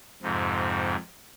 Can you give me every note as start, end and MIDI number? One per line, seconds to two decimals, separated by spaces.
0.22 0.95 41
0.22 0.95 44
0.22 0.95 48